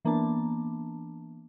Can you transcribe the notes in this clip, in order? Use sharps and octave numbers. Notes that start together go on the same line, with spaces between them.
E3 A#3 B3 D4 A5